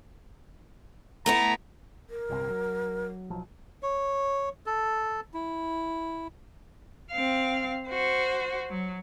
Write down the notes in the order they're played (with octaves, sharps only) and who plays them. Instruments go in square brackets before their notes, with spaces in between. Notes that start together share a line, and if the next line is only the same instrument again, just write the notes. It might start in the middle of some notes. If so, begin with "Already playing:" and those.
[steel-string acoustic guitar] A3 B3 E4 [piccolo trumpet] A#5
[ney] A#4
[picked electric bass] G1 C2 C3
F#3
B1 F3 F#3
[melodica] C#5
A4
E4
[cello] C4 F5
F#4 C5
F#3